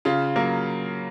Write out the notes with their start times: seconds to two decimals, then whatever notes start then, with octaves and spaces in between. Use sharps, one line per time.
0.05 C#3 F4
0.36 F#3 A#3